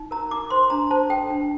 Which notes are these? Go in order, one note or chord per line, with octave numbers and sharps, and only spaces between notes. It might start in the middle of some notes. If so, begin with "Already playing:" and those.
Already playing: D#4
A#4 A#5
D#4 D6
C5 C6
D4 A#5
C5 A5
A4 G5
D4